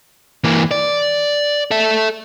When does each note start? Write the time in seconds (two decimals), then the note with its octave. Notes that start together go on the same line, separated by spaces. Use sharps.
0.44 E3 A#3
0.71 D5
1.71 A4 E5